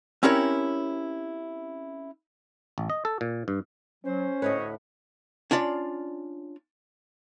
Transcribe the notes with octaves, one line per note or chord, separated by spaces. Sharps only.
C4 C#4 E4 G4 A#4 C#5
A1
D#5
A4
A#2
G2
F#3 C#4 C5
D2 A2 B4 C#5 D#5
C#4 D4 F4 D5